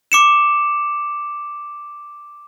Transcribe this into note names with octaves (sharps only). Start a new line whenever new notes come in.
D6 C#7 E7